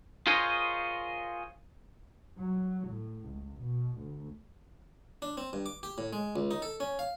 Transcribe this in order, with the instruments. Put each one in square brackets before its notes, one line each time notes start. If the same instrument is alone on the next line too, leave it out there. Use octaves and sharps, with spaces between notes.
[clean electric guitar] F4 G#4 A#4 C5 C#5 D#5
[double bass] F#3
A2
C#2
B2
D2
[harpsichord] D4
C4
G2
D6
G4
A2
G#3
C#2
D#4
A4
C#4
F5